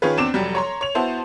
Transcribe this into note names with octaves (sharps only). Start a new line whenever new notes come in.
D#3 C#4 F4 G#4 B4
E2 C4 D4 D6 E7
F1 F#3 G3
C#5 A#5 C6
C#5 F7
B3 E4 F#4 C5 A5